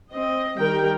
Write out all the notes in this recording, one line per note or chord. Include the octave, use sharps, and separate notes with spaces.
C4 D#5
D#3 G3 G4 A#4 G5